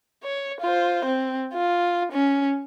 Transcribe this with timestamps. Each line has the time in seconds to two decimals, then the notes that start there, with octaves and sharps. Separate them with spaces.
0.24 C#5
0.61 F4 C5
1.05 C4
1.54 F4
2.12 C#4